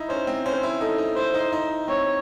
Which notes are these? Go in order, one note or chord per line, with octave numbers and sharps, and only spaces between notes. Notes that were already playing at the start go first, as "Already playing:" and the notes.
Already playing: D#4 E4
C#4 C5
C4
C#4 C5
E4
D#4 A4
D#4
E4 C5
D#4
D#4
C4 C#5